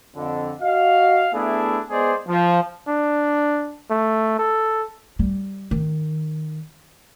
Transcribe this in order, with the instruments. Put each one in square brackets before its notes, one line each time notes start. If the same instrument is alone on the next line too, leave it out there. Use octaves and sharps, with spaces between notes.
[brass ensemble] F2 D3
F#4 D#5 F5
A3 B3 D4 E4 G#4
G#3 B3 G#4 C5 D5
F3
[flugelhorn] D4
A3
A4
[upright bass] G3
D#3